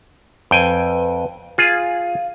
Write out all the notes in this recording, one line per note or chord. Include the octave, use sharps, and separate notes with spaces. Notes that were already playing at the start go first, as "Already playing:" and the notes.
F2 B4 G5 G#5
F4 G#4 F5